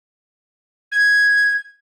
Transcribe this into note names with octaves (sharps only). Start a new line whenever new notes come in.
G#6